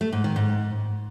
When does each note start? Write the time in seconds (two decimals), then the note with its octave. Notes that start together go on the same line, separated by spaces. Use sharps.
0.01 A3
0.12 G#2
0.24 D#3
0.36 G#2